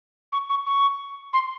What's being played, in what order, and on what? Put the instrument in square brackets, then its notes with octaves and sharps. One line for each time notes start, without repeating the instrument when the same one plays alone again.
[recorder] C#6
C#6
C#6
C6